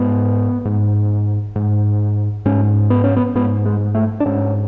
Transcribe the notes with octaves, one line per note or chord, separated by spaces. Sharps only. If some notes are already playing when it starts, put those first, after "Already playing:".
Already playing: G#2 B3
G#2
G#2
G#2 C#4
B3
C#4
B3
G#2 B3
G#3
A3
D4
G#2 C#4